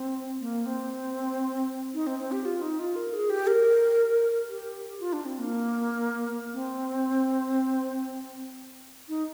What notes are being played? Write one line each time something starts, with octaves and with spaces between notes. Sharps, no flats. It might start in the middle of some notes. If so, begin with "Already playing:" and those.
Already playing: C4
A#3
C4
D#4
C4
C4
G4
F4
D#4
F4
A#4
G#4
G4
A#4
G4
F4
D4
C4
A#3
C4
D#4